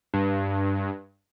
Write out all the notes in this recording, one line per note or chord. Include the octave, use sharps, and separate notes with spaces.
G2